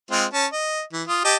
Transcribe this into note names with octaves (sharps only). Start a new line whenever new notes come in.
G#3 C4 F4
C#4 A5
D#5
E3
F4 D#6
G4 D#5 A5